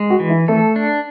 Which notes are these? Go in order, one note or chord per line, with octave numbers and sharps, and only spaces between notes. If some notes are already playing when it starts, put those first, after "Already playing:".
Already playing: G#3
F#4
E3
E4
A3 A4
D4